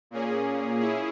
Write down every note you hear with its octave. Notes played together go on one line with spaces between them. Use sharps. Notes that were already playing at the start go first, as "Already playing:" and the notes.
A#2 A#3 C#4 G#4
C#4 E4 G#4